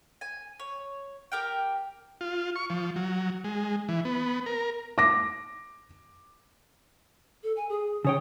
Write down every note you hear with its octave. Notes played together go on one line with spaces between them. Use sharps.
G#5
C#5
G4 A#4 G5
F4
C#6
F3
F#3
G#3
E3
B3
A#4
D6 A#6
A4
G#5
G#4
C#3 C#5 G5 D#6